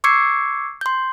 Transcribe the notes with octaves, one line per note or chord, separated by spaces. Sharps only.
C#6 D6 E6 G#6 C7 C#7
C6 G6